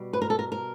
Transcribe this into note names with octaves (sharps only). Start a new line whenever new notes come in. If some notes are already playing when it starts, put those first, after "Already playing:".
Already playing: B2 G3
B4
A#4
A4
A#4
A#4